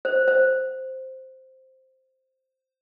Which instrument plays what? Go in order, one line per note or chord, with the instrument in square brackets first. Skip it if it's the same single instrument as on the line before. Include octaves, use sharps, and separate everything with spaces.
[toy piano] C5
C5